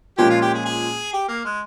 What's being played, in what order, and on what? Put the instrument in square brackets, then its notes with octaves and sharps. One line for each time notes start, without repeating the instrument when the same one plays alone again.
[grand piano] A#2 F3 G#3 C#4 [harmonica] G4
[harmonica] F4
G4
G#4
G#4
G4
A#3
G#3